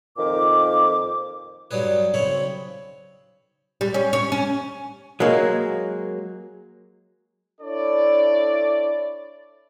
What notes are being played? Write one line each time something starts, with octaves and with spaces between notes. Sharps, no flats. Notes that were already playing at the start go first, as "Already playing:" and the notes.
F2 A#2 D#3 D6
G2 F#3 G3 G#4 B4
B1 C#3 C4 C#5 B5
G3
C#4
C#5
C#4
F#3 G#3 A#3
D4 E4 A4 C#5 D5